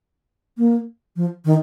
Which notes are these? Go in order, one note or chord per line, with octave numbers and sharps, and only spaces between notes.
A#3
F3
D#3